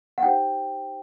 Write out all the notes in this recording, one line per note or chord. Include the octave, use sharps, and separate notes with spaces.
F#5
D#4 G4 C5 G5